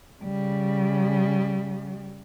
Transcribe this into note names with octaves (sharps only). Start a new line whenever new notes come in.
C#3 G3